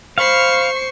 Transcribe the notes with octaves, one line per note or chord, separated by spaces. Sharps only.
C5 F5 B5 C#6 C7